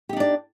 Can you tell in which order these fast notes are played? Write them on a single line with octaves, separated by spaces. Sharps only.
G4 D#4 D4 D5